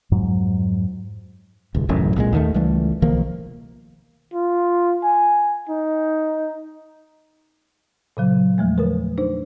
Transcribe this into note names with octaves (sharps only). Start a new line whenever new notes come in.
F2 G#2 F#3
D#1 C#2
D#1 A1 F#2 C#3
C2 A#2 G3 G#3
D#2 D#3 A3
C#2 E3 G3 A3
B1 D#3 F3 A#3
F4
G#5
D#4
A#2 C#3 F#3
E2 F3 G#3 A3
D3 A#4 B4
D4 D#4 C5